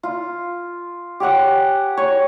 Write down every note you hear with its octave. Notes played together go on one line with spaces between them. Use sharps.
F4
G4 C#5 F#5 G#5
C#5